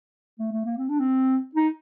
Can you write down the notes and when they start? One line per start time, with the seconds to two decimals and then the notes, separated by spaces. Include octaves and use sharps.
0.39 A3
0.52 A3
0.65 A#3
0.78 C4
0.89 D4
0.99 C4
1.55 D#4